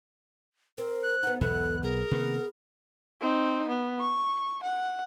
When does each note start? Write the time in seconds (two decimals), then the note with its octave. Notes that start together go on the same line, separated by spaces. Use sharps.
0.78 C4 A#4
1.03 F#6
1.23 B3 D#4 F#5
1.41 B1 E2 G#2 B2 B3 A4 E5 F#6
1.83 B1 G#4 A#4
2.11 C3 D#3 A#3 B3
3.21 C4 D#4
3.68 B3
4.00 C#6
4.63 F#5